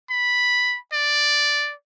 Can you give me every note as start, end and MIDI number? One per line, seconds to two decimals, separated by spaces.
0.10 0.77 83
0.93 1.74 74